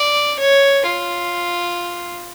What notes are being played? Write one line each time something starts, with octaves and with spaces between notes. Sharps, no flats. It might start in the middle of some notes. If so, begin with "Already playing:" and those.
Already playing: D5
C#5
F4